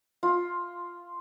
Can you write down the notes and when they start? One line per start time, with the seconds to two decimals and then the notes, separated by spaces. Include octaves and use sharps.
0.23 F4